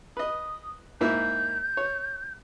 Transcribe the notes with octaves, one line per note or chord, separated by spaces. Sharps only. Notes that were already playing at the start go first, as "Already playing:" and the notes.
B4 D#5 D#6
G#2 A#3 E4 G6
C#5